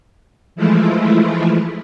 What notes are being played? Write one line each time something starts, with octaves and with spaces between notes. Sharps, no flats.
E3 F3 G#3 A3 E4 F4